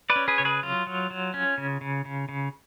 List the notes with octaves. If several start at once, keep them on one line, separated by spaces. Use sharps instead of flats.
B4 D5
C#4
G#4 B4
C#3 C#5
G#4 B4
F#3 F4
F#3
F#3
C#4
C#3
C#3
C#3
C#3